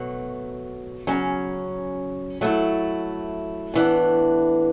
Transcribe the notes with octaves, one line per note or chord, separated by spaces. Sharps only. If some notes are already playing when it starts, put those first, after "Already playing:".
Already playing: B2 F#3 A3
C#3 F#3 C#4
F#3 A3 E4
A2 E3 B3 D4